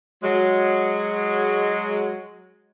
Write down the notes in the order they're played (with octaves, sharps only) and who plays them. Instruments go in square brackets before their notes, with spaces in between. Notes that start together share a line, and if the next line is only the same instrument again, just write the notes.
[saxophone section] F#3 G#3